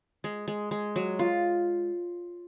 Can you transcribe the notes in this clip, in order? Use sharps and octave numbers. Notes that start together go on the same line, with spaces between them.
G#3
G#3
G#3
F#3
F4